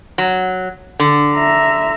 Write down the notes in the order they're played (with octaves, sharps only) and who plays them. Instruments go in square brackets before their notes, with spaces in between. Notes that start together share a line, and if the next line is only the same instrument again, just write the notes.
[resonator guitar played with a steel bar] F#3
D3
[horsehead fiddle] E5 A#5